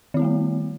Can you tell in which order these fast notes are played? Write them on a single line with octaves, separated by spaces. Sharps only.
D#3 E4 B3 G3 A3